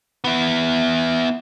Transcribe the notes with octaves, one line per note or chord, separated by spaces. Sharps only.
B3 E4